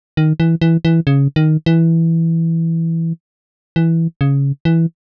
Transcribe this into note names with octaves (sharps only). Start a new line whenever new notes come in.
D#3
E3
E3
E3
C#3
D#3
E3
E3
C#3
E3